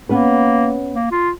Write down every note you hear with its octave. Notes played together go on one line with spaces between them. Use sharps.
A#3 B3 C#4 B4
A#3
F4